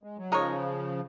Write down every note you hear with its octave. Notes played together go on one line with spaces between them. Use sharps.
G#3
F#3
C#3 F3 G#3 D#4 A#4 C#5